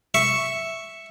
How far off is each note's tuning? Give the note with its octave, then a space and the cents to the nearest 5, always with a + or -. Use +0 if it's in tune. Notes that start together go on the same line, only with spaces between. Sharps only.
E5 +0 C#6 +0